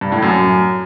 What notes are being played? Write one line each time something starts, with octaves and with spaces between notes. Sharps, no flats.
G2
A2
F#2